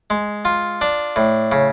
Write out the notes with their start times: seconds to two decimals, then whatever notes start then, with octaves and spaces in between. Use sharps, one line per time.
0.10 G#3
0.45 F4
0.81 D4
1.16 A2
1.52 C#3